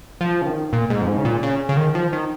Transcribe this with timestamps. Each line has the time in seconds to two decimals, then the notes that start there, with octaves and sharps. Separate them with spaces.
0.21 F3
0.42 C#3
0.46 D#3
0.73 A#2
0.90 G#2
1.02 F2
1.08 G#2
1.18 C#3
1.25 A#2
1.43 C#3
1.69 C#3
1.77 D#3
1.95 F3
2.12 D#3